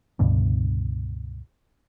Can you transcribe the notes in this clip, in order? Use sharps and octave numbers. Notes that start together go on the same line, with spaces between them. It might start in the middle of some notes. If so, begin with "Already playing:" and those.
C#2 G2 B2 D3